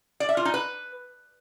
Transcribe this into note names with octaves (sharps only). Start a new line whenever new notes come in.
D5
E5
F4
D#4
B4